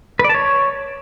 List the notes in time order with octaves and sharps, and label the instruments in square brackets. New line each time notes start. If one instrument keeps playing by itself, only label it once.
[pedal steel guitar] B4
D5
A5
C#5